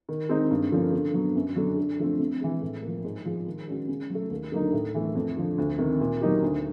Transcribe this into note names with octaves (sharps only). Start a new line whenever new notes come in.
D#3
G#3 C4 D#4
G2
D3 F3 A#3 C#4
D3
F#3 B3
F#2
D3 F#3
D3
F3 A3 C4
C3
E3 G#3
A2
F3 A#3
G#2
F3 G#3
D#3
G#3 C#4 F#4
C#3
F#3 A3
D#2
D3 F#3 A#3 D#4
A2
E3 A3
F2
D3 F3
D2
C3 D#3
A#2
F#3 A#3 D#4 G4
D2